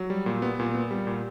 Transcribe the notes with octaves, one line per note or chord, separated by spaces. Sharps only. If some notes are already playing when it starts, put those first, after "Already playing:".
Already playing: F#3
G3
A#2
B3
A#2
B3
G3
A#2